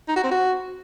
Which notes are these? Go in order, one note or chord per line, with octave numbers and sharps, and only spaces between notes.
D#4
F#4
C4
F#4